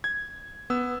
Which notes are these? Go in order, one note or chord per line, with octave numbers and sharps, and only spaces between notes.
G#6
B3 E6